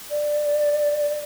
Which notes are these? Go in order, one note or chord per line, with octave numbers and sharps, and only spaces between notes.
D5